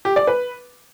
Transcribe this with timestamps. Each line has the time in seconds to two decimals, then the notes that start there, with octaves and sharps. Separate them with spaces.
0.05 G4
0.16 D5
0.27 B4